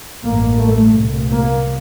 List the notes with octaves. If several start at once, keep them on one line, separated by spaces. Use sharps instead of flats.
A1 G2 A#3
A3
C2 A#2
A#3